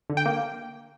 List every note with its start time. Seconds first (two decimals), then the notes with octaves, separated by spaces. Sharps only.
0.10 D3
0.17 G5
0.26 A#3